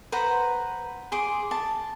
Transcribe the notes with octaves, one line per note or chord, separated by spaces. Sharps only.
B4 C5 F#5 A#5
G#4 C6 D6
A5